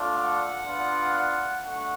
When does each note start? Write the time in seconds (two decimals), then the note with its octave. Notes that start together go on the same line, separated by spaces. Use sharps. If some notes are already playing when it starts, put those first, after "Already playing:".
Already playing: A3 D4 F4
0.16 F#5
0.65 B3 D4 F4
1.13 F#5
1.62 A3 D4 F#4 F#5